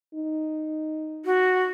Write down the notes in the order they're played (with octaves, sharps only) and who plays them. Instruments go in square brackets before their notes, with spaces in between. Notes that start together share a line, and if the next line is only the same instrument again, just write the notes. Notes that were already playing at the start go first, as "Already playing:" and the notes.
[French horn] D#4
[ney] F#4